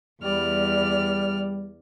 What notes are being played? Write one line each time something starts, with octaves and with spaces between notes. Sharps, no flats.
E2 G3 D5 F6